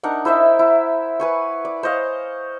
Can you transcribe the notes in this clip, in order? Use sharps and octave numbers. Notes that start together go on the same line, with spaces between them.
D4 D#4 A#4 F#5
E4 C5 D#5 E5
E4
B4 G#5 C#6
D5
C5 C#5 D#5 F5